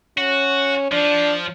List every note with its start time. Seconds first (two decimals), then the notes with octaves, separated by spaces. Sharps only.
0.18 C#4 F#4
0.92 F3 D4